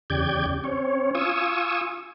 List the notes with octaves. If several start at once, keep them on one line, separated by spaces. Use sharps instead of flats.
E2 C#3 G4 D5 G6 G#6
C4 C#4 C#5
F4 G#5 C#6 D#6 E6